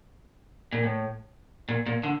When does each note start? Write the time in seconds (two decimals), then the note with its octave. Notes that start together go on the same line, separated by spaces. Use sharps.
0.73 A#2
0.84 A2
1.69 A#2
1.86 A#2
2.03 D3